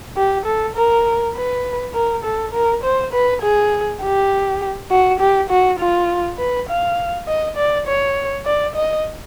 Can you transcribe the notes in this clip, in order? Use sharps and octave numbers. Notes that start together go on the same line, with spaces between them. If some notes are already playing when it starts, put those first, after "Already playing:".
G4
A4
A#4
B4
A#4
A4
A#4
C5
B4
G#4
G4
F#4
G4
F#4
F4
B4
F5
D#5
D5
C#5
D5
D#5